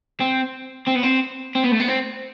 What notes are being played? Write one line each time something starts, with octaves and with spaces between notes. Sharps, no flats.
C4
C4
B3
C4
C4
B3
A3
B3
C4